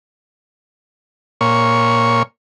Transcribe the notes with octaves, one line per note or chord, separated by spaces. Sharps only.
A#2 C#5